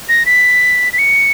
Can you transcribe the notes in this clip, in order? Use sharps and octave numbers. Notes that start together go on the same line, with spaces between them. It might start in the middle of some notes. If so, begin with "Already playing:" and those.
A#6
B6
B6
C#7